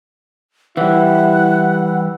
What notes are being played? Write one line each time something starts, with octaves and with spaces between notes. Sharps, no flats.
E3 G3 E4 F#5